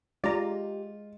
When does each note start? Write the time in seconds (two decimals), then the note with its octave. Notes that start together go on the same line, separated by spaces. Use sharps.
0.24 G#3 F4 G4 D5 A#5